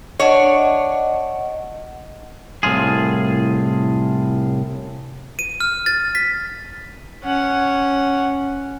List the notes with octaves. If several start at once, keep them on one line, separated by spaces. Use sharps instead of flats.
D4 C#5 D#5 F#5
C2 A2 F4 G#4
D#7
F6
A6
B6
C#4 F#5